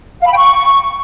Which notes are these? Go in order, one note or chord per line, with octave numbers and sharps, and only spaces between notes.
F5
B5
G5
C#6